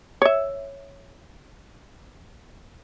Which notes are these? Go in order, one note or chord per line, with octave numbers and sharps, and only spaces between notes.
C#5 E5